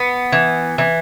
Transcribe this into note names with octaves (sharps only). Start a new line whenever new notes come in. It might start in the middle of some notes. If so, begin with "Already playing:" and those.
Already playing: B3
E3
E3